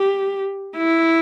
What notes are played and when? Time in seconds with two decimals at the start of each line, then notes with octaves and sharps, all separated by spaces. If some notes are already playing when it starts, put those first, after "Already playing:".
Already playing: G4
0.76 E4